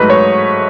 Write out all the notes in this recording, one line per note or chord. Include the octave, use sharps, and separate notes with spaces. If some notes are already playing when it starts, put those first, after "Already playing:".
Already playing: G#2 F#3 A3 B4 D#5
C#5